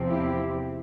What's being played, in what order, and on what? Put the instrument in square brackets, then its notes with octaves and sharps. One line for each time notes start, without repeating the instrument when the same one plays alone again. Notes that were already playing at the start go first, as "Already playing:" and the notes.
Already playing: [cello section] E2 C3 F3 C4
E4 G4